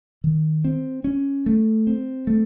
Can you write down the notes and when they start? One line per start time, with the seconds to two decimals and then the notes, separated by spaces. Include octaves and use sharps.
0.24 D#3
0.64 C4
1.04 C#4
1.46 A3
1.87 C4
2.27 A3